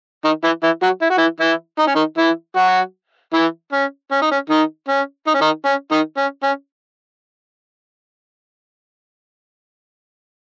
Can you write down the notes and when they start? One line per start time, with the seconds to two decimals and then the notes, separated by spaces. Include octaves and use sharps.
0.25 D#3 D#4
0.44 E3 E4
0.63 E3 E4
0.83 F#3 F#4
1.02 E4
1.10 F#4
1.18 E3 E4
1.40 E3 E4
1.79 D#4
1.87 C#4
1.95 D#3 D#4
2.18 E3 E4
2.56 F#3 F#4
3.34 E3 E4
3.72 C#4
4.12 C#4
4.22 D#4
4.32 C#4
4.50 D#3 D#4
4.89 C#4
5.27 D#4
5.34 C#4
5.41 D#3 D#4
5.65 C#4
5.92 D#3 D#4
6.17 C#4
6.43 C#4